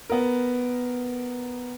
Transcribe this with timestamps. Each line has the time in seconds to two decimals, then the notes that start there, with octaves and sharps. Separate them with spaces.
0.10 B3 A#4